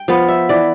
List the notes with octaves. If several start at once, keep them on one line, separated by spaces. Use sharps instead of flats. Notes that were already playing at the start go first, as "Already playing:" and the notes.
Already playing: G5
F3 B3 F5
E5
E3 D5